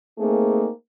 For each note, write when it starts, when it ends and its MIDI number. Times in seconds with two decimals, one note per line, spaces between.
0.18 0.68 57
0.18 0.68 58
0.18 0.68 60
0.18 0.68 63
0.18 0.68 68